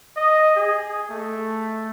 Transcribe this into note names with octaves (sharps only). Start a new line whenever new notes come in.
D#5
G#4
A3